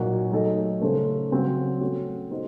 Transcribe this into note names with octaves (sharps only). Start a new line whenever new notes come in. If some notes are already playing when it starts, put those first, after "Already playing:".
Already playing: A#2 F#3 A#3 D#4 F#4
F#3 A3 D#4 A4
C#3 A3 C#4 A4 C5
C#3 F#3 C4 F#4 C5
A3 C#4 F#4
A3 D#4 F#4 C5